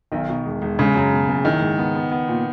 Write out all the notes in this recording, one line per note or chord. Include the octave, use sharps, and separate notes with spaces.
B1 D#3
B2
E1
E1
C#3 G#3
F#2
B2
F#1
D#3 E4
G#2
B3
B3
B3
A#2